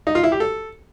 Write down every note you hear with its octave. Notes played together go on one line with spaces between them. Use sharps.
D#4
F4
E4
G4
A4